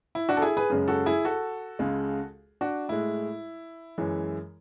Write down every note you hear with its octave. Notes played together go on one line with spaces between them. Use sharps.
E4
D4 F#4
A4
E4 G#4
G#4 B4
F#2 C#3 G#3
F#4 A4
E4 G#4
F#4 A4
C#2 C#3 G#3
D4 F#4
A2 G#3 E4
F#2 E3 G#3